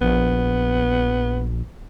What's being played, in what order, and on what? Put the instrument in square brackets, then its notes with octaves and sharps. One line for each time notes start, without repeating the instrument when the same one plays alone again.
[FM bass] A#1 [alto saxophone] B3